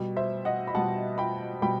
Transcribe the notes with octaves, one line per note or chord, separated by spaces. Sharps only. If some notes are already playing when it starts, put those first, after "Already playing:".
Already playing: B2 G3
C5 E5
D#5 F#5
B5
B2 G3 F#5 A5
G5 B5
B2 G3 G5 B5